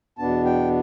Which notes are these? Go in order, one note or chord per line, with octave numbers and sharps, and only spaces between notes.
E2 B2 B3 D4 A5
G5